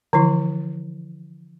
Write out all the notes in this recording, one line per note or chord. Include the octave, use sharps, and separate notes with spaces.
D3 E3 F3 E4